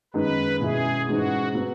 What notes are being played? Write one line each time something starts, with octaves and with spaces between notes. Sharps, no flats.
F#2 D#3 G#3 B3 D#4 B4
B2 G#3 C#4 E4 G#4
G#2 E3 G#3 C#4 F#4
F#3 B3